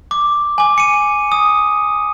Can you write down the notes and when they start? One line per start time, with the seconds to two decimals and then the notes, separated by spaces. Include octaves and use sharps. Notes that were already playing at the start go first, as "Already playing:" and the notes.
0.11 D6
0.58 G#5 D6
0.78 C#7 D#7
1.32 D#6